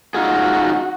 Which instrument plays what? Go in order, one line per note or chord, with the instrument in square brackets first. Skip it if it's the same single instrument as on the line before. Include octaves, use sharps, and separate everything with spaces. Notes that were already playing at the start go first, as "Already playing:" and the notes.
[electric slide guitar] D#4 F4 G#4 [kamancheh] F#4